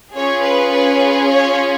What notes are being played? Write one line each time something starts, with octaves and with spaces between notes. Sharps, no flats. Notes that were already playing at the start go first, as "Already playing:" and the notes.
C#4 F4 G#4 C#5
B4
B4
C#5